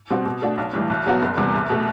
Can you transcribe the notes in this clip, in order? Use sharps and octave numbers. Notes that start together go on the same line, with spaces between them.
B2 G3 C4 F#4
B2
A3 D4 F#4
B1
A2 E3 G3
C2
B2 F#3 B3 F#4
F#1
E2 C3 G3 B3
C2
B2 A3